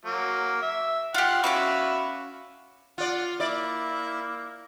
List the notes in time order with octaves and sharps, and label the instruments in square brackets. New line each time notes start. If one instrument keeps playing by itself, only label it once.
[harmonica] F#3 A#3
E5
[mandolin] F4 G4 [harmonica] F5 F#5
[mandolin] C#4 F5 D6 [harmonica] F#4 E5 B5
[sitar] F4 D5 [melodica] F#5
[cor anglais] A#3 [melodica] E4 E5 [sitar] D5